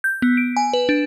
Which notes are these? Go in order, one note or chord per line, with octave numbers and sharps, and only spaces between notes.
G6
B3
D7
G#5
B4
D4